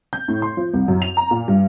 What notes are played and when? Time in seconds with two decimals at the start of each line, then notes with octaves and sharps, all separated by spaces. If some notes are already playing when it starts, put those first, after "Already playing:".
0.13 G6
0.28 A2
0.42 C6
0.57 F3
0.74 C2
0.88 F#2
1.02 F7
1.17 A#5
1.31 A#2
1.48 G2